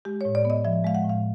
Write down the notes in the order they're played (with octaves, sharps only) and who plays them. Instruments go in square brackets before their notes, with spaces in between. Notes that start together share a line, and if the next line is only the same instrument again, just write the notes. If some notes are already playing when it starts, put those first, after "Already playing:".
[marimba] G#3 G4
A2 C#5
D5
B3 D#5
F3 E5
G#3 F5
F#5
A2 F5